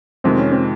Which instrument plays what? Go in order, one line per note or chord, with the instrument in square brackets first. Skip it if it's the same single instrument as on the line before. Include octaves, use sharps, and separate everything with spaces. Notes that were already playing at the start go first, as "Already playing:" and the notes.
[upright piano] F2 C3 D#3 G#3 [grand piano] C4
[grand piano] C#4
C4